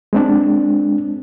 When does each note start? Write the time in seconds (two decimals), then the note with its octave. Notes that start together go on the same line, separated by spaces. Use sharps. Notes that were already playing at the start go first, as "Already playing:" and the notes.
0.13 G#3 C4 D4